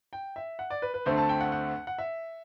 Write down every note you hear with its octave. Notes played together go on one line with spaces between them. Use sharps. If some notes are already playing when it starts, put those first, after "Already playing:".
G5
E5
F#5
D5
B4
B4
D2 D3 A3 C4 C5
A5
G5
F#5
F#5
F#5
E5